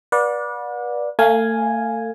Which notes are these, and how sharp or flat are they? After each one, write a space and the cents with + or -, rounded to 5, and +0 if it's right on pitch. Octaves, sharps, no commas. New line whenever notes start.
B4 -30 D5 +0 F#5 -40
A3 +35 F5 +0 G#5 +0